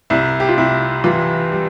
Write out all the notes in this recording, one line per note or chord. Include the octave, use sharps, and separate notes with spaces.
C2 E4
G4
F4
C3 E4
E3 F4
G3